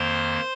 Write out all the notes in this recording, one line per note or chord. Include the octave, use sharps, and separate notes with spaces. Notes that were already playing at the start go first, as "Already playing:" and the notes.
Already playing: F2 D#3 A#3 C5 C6